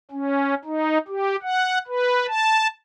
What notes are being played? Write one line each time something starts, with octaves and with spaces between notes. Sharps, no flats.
C#4
D#4
G4
F#5
B4
A5